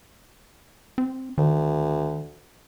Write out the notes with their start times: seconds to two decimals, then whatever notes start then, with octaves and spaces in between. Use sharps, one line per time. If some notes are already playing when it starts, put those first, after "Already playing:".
0.98 C4
1.38 D2 D#3